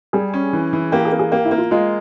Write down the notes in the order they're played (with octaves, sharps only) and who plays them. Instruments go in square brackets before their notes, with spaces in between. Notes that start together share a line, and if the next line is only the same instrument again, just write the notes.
[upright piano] G3 [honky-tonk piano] G#4
[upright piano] C#4
E3
E3
[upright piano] A#3 [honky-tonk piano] G4
[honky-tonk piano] G#4
[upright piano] A#3
[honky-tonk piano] G#4
[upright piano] A#3 [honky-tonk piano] G4
[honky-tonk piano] E4
[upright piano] A#3
[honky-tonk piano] F4
[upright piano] G#3 [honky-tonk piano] F4